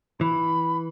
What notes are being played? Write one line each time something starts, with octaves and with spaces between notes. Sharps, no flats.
E3 B5